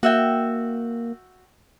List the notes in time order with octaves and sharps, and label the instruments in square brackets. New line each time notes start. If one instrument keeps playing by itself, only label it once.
[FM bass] A#3 [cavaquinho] F#4 E5 G5